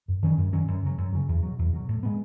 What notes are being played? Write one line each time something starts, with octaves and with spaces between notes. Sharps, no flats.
F#2
D#3 F#3 C#4
F#2
D#3 F#3 C#4
F#2
C#3 F#3
F#2
C#3 F#3
E2
B2 F#3
E2
B2 F#3
A2
G#3 B3